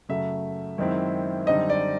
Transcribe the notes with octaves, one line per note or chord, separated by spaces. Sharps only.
F#2 C#3 F#3 A3 E5
F#2 D#3 G#3 C4 E4
F#2 D3 G3 C4 D#4 D#5
D5